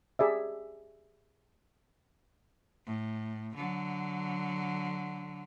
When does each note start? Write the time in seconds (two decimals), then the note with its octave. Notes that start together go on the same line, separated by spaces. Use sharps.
0.19 G4 G#4 D5 E5
2.86 A2
3.55 D3 F#3